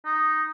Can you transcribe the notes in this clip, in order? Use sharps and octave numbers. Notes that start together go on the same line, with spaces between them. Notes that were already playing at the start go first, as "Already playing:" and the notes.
D#4